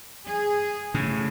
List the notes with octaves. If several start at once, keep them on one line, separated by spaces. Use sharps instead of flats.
G#4
A2 C#3